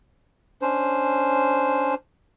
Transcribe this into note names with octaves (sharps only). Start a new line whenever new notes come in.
C#4 D4 C5